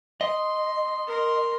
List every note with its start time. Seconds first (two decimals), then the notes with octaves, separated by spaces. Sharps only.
0.21 D#5 C6
1.07 A#4 C6